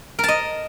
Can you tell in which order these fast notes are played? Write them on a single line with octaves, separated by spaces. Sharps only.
A#4 A5 D#5